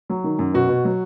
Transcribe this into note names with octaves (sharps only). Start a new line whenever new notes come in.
F#3
D#3
F#2
B2 F#4
B2
F#3